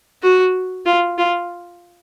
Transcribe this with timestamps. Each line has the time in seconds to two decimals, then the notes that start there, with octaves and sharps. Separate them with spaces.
0.23 F#4
0.86 F4
1.18 F4